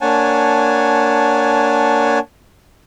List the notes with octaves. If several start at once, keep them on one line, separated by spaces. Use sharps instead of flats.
A#3 D4 C#5 F#5 G#5 A5